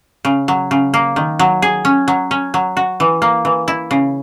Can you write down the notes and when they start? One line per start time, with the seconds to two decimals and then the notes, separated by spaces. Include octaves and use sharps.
0.25 C#3
0.48 F#3
0.71 C#3
0.94 A#3
1.16 D#3
1.39 F#3
1.62 G#4
1.85 C#4
2.08 F#3
2.31 C#4
2.54 F#3
2.77 F#4
3.00 E3
3.22 A#3
3.45 E3
3.68 E4
3.91 C#3